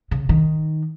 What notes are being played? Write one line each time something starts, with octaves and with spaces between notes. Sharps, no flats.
C#3
D#3